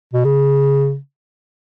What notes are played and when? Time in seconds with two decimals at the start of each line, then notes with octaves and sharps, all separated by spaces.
0.13 B2
0.24 C#3